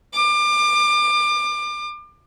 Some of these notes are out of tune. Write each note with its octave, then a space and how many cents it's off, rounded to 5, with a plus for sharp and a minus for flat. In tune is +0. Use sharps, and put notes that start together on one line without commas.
D6 +30